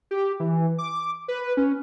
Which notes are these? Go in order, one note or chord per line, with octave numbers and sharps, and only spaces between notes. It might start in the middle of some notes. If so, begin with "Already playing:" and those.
G4
E3
D6
B4
C#4